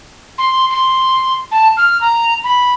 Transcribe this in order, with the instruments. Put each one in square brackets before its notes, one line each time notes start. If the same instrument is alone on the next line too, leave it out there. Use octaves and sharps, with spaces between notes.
[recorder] C6
C6
A5
F6
A#5
B5